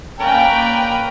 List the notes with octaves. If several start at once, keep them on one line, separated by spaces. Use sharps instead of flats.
A#3 C#4 A#4 B4 D5 G5